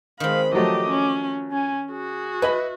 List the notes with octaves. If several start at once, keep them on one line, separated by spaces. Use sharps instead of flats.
D#3 G#3 C4 F5 B5
F3 F#3 A3 G4 D#5 D6
C#4
C#4 G#5
F#4 G#4
E4 B4 D#5 B5